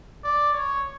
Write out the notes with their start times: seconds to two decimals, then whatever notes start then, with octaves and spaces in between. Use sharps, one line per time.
0.24 D5
0.53 C#5